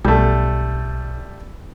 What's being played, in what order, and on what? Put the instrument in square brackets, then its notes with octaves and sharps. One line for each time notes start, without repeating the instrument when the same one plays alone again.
[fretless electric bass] B1 [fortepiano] G3 A3